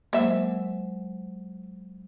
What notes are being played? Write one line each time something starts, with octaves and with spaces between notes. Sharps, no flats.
F#3 G#3 A#3 C5 E5